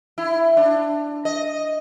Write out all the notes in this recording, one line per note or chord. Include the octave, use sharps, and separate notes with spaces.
E4
D4
D#5